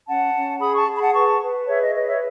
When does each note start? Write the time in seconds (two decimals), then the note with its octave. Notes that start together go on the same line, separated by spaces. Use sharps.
0.07 C#4 F#5 A5
0.34 C#4
0.61 G#4 B5 D#6
0.73 A5 C#6
0.87 G#4
0.96 B5
1.01 F#5 A5
1.14 B4 A5 C#6
1.41 B4
1.67 G#4 C#5 E5
1.81 D#5
1.94 B4 D#5
2.08 C#5 E5